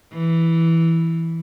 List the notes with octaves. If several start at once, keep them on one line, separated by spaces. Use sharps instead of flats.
E3